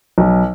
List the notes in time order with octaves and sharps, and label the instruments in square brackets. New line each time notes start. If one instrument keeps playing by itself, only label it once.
[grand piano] B1